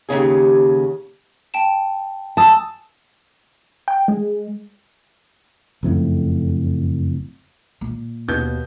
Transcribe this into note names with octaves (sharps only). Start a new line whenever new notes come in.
D#2 G#2 C#3 G#4
G5 A5 E7
G#5 A5 D#6 E6
G5
G#3
F#1 F2 A2
A#2
D#2 B2 G6